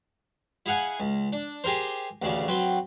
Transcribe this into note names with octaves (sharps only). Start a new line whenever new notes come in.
E4 G#4 F5 F#5 G#5
C#2
D4
G4 G#4 A#4 C5
A1 D2 C#3 D5
F#3 C4 B4 G5